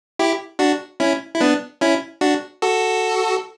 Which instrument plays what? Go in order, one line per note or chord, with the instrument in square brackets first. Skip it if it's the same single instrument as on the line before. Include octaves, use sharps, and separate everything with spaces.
[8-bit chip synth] E4 G4
D4 F#4
C#4 E4
E4
B3 D4
C#4 E4
D4 F#4
F#4 A4